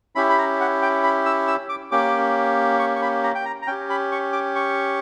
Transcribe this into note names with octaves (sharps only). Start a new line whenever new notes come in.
C#4 E4 G4 B5
B5
A#5
F#5
G5
B5
E6
E6
D6
A#3 C#4 G4 D6
C#6
C#6
B5
A#5
G5
A#5
A#5
C#4 G4 G5
B5
C#6
D6
C#6